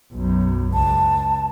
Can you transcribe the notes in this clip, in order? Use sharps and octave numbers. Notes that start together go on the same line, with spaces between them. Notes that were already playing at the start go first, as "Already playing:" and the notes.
B1 F#2
C#2 A5